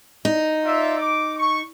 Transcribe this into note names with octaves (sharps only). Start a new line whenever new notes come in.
D#4
F4 D5 E5
D6
C#6